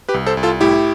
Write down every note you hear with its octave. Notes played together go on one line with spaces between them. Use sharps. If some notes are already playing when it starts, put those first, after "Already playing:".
G4 B4
C2
A4 C5
C2
F4 A4
A2 E4 G4